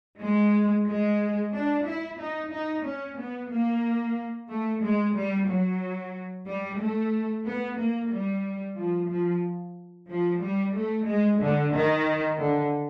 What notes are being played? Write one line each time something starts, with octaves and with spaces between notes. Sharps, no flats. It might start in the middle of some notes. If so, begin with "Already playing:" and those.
G#3
G#3
D4
E4
D#4
D#4
C#4
B3
A#3
A3
G#3
G3
F#3
G3
A3
B3
A#3
G3
F3
F3
F3
G3
A3
G#3
D3
D#3
D3